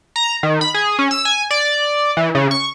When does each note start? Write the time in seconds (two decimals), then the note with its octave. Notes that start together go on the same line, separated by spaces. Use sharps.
0.16 A#5
0.43 D#3
0.61 B5
0.74 G#4
0.99 C#4
1.11 E6
1.25 G#5
1.51 D5
2.17 E3
2.35 C#3
2.51 C#6